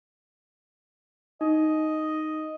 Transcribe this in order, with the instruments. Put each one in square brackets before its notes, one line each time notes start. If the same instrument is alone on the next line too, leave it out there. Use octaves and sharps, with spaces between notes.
[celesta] D#4 [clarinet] D#5